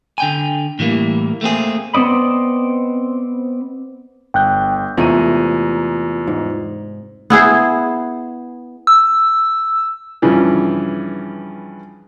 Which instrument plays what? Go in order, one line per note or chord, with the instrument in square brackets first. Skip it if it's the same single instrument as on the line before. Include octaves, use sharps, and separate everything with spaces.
[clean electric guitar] D3 G5 G#5
A2 E3 G3 A#3
A3 A#3 C4 G#4
[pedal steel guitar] B3 C4 D5 D#5 B5
[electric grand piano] G1 G6 [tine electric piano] G5 F#6
[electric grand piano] E2 A#5 D#7 [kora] C3 G#3 A3 [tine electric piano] F4
[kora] G#2
B3 E4 G#4 C5
[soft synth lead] E6
[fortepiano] G2 C#3 E3 F3